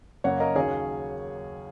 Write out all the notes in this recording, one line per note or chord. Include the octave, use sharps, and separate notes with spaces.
F#2 C#3 A#3 C#4 C#5 F#5
A#4 D#5
D#2 C#3 F#3 C#4 G#4 C#5